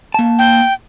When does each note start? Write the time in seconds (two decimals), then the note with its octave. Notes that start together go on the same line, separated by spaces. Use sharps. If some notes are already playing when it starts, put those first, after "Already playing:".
0.14 A#3 A5
0.39 G5